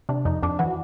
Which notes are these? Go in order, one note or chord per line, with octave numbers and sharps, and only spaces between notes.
C3 D4
F2 D#4
F2 D4
E3 F#4